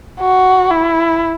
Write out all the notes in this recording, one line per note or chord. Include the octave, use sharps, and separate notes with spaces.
F#4
E4